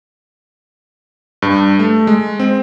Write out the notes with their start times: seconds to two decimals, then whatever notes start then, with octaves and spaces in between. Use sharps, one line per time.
1.42 G2
1.79 A3
2.07 G#3
2.40 C4